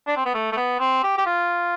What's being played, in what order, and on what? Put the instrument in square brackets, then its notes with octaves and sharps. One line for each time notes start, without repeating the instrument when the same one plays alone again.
[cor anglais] D4
C4
B3
A3
A3
B3
C4
G4
G4
F4